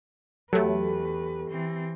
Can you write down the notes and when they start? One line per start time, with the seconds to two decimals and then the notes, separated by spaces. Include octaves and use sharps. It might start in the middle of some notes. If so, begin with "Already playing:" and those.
0.53 E2 F#3 A3 G4 A4 B4
1.49 E3 C4